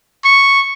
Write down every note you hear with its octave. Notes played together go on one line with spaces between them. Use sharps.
C#6